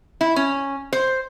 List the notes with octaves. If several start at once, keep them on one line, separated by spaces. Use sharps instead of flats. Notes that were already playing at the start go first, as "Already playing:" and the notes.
E4
C#4
C5